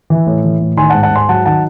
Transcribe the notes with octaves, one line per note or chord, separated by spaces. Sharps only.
E3
A2
E3
A2
D#3 G#5 C6
F#5 A5
G#2
F#5 A5
G#2 G#5 C6
F#3 F#5 A5
D#3 F#5 A5